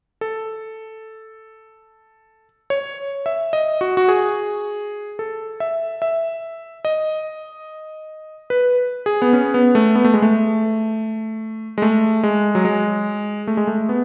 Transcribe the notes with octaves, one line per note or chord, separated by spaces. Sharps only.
A4
C#5
E5
D#5
F#4
F#4
G#4
A4
E5
E5
D#5
B4
G#4
B3
C#4
B3
A3
B3
A3
G#3
A3
G#3
A3
G#3
F#3
G#3
A3
G#3
A3
B3